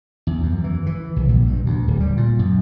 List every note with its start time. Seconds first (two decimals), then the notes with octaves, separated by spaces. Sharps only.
0.27 E2
0.43 F#2
0.64 E3
0.86 E3
1.16 C2
1.29 A#1
1.46 G2
1.66 D2
1.88 D1
2.00 G3
2.17 A#2
2.39 F#2